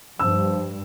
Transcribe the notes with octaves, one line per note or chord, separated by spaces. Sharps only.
G2 F3 E6